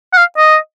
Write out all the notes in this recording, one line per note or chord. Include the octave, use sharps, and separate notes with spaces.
F#5
F5
D#5